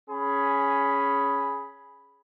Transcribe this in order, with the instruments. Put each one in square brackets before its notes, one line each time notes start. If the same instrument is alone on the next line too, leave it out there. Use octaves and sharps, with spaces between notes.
[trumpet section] C#4 G#4 B5